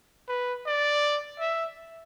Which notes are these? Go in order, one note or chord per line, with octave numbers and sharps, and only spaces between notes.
B4
D5
E5